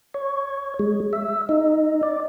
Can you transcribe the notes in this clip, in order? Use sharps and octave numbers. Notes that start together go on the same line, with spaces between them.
C#5
G#3
E5
D#4
D5